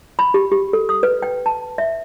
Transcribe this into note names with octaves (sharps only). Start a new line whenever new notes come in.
B5
G4
G4
A4
D#6
B4
G5
A5
E5